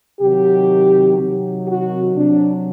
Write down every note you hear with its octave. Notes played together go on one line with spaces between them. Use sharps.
C3 D#3 F#3 G4
C3 D#3 F#3
F#4
C3 F#3 D4